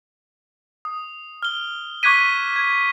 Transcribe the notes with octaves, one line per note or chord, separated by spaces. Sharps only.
D#6
F6 G7
C#6 D6 F#6 G#6 B6 D#7
G#6